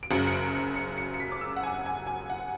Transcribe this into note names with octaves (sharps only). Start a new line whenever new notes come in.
D7
F#1 F#2 C#3 F#3 C#7
C#7
D7
C#7
C#7
C#7
C#7
B6
D6
E6
F#5
G#5
G#5
G#5
F#5